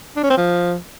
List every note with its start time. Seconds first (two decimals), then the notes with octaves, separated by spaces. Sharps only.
0.17 D4
0.23 C#4
0.30 C4
0.37 F3